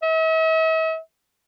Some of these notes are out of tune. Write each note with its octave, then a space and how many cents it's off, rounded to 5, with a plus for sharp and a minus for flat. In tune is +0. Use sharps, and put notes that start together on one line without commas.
E5 -45